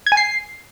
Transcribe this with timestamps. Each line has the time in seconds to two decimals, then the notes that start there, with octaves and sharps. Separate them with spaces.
0.06 G#6
0.12 G#5
0.17 C7